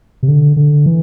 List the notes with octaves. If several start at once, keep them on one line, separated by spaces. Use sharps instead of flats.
C3
D3
D3
E3